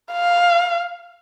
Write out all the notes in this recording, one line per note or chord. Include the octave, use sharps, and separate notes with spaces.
F5